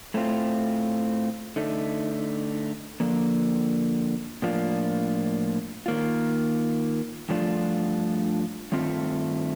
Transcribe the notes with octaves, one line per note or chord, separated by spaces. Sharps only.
A2 A3 C4 F4
D3 A3 D#4
D3 F3 A#3
A2 F3 A#3 D4 F4
D#3 A#3 F4
G2 F3 A3 D4 F4
G2 D#3 A3 C4 F4